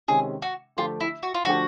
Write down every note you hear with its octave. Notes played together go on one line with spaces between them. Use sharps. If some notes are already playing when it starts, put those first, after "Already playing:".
C3 D#3 G#3 C#4 G#4
F#4
D3 F3 A3 D4 F4 G4
E4
F#4
F4
D3 F3 A3 D4 F#4 G4